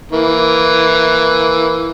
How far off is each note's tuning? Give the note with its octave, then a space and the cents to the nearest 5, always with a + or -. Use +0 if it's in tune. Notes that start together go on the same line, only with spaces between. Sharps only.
E3 +0 A#3 +0